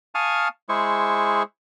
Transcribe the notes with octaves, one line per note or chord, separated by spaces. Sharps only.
F5 G#5 A5 C#6 D#6 F6
G#3 E4 G#4 C5 C#6